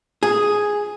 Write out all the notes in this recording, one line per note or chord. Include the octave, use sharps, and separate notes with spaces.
G#4